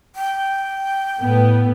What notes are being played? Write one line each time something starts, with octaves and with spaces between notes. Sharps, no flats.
G5
A2 A3 B3